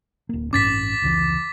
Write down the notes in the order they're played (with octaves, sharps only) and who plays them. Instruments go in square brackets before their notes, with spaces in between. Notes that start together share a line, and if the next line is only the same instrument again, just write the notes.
[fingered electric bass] D1 A#3
[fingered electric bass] A1 G2 C#4 [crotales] D6 A6 B6
[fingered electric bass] F1 C#2 E3